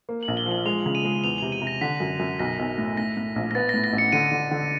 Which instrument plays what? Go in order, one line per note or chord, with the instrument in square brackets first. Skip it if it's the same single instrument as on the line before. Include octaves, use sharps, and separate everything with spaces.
[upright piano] A#3
[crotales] F#7
[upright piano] A#1
[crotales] G7
[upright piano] F3
[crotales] F#7
[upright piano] G#3 [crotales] F7
[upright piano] C#3
[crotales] D#7
[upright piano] G#3
[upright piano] E2 [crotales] F7
[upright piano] C3 [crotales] F7
[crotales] D#7
[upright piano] C3
[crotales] A#6
[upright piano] D3 [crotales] B6
[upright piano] F#2
F#2
[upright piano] B1 [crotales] A#6
[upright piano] B1
A2
[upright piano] A2 [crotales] A#6
[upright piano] A2
A#1
[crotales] A#6
[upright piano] B3 [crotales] A6
[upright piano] A2 [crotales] A#6
[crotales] A#6
[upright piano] A1
[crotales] C#7
[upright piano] D3 [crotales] D#7
[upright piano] D3
D3